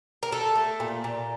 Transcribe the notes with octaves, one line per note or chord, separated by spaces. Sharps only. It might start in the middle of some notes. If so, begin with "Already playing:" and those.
A#4
A3 A4
A3
A#2
A#2